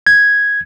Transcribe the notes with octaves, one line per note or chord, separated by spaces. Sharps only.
G#6